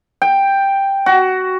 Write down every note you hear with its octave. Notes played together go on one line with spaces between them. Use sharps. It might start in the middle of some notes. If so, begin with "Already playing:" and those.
G5
F#4